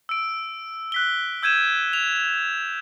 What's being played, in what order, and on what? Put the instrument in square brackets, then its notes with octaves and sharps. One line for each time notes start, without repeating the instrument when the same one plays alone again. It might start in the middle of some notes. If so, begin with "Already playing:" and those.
[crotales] E6 D7
F#6 B6 G7
E6 G6 G#6 D#7 E7
F7